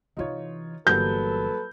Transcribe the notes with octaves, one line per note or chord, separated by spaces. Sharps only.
C3 E3 D#4 F4 C#5
G1 E3 F#3 G3 A#3 A4 B4 G6